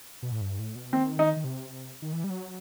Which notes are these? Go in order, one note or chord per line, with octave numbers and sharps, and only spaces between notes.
B2
A2
G2
A2
B2
D#3 C4
D#4
D#3
C3
D#3
E3
G3
F#3